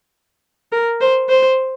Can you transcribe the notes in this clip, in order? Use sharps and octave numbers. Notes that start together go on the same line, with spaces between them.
A#4
C5
C5